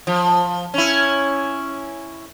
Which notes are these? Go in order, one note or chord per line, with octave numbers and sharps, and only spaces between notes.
F3
C#4 E4